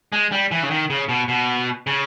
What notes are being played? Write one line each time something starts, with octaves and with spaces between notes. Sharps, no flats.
G#3
G3
E3
C#3
D#3
C#3
B2
B2
C#3